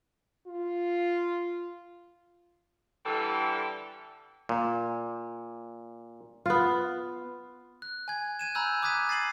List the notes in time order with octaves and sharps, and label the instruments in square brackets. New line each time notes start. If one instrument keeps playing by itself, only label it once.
[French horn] F4
[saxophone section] D3 E3 G3 A4
[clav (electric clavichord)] A#2
[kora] B3 F4
[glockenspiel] F#6
G#5 G#6
F#6 G#6 D#7 E7
G#5 A#5 B5 E6 F#6 G6
D6 D#6 F#6 G#6 B6 D#7
A6 C7 D#7 F#7